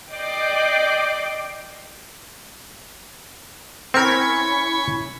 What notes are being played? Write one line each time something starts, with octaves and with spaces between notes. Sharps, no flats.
D5 D#5 G5 D6 G6 C7
C4 C#4 E4 A#4 B5 C#6 G#6 B6